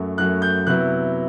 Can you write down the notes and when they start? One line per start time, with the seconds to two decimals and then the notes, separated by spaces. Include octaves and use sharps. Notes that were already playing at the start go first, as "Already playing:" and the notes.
Already playing: F#2 F#3 A3
0.18 F#2 F#3 A3 F#6
0.42 G6
0.67 C3 F#3 B3 E4 F#6